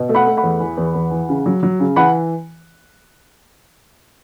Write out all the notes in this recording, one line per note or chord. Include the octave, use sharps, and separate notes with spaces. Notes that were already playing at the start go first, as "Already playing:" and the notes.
Already playing: B2
A3
F#5 B5
A3
F#5 B5
E2
E3
E2
E2
E3
C#3
F#3
F#3
C#3
E3 F#5 B5